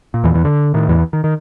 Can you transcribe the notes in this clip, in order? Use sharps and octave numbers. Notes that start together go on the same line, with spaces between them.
A#2
E2 E3
E2 E3
D3
A2 D#3
E2 E3
D#3
D#3